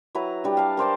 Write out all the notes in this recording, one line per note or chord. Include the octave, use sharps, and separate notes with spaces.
F#3 E4 B4 A#5
G3 D4
F5 A5
A#4 C5 D5 A5